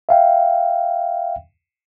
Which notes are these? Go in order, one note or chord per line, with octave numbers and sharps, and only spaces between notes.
E5 F5 G5